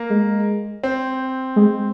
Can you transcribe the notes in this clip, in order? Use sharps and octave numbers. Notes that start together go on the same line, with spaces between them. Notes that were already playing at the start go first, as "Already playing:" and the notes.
Already playing: A#3
G#3
C4
G#3